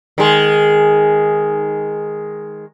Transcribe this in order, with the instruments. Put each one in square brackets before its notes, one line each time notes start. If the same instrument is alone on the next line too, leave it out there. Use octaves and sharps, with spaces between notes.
[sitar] D#3 G#3